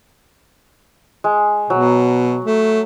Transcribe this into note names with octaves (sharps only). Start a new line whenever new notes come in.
G#3
B2 F#3
A3